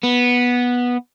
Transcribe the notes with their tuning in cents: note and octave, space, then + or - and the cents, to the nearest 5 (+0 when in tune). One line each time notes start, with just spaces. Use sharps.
B3 -10